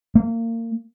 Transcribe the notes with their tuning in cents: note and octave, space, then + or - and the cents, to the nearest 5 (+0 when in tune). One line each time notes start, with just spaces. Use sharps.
A#3 -30